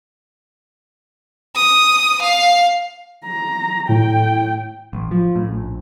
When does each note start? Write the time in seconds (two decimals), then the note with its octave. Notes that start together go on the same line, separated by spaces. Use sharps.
1.56 D#6
2.22 F5
3.26 A#5
3.89 A2 G5
4.93 A1
5.11 F3
5.36 A2
5.49 A#1